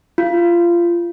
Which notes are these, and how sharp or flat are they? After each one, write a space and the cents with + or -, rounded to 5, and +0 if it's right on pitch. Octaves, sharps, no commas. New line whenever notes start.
F4 -20